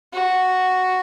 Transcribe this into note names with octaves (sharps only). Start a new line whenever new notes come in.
F#4